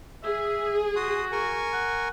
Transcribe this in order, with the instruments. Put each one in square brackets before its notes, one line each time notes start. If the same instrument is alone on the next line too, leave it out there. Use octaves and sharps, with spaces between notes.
[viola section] G#4 [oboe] E5
[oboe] F#4 [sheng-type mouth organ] C6 D#6
[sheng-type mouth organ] A#4 G#5 C#6
[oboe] F#5